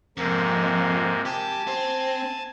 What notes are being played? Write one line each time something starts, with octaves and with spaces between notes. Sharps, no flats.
F2 G#2 C3 A#3
G4 G#5 A5
C4